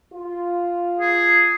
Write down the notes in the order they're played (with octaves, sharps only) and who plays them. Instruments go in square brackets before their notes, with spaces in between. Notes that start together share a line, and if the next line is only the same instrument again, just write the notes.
[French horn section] F4
[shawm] G#4